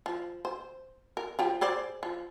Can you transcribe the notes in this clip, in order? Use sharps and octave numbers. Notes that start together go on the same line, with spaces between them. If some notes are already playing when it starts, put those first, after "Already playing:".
F3
C5
A#4
F3 G4 G5
G#4 C5 D5
F3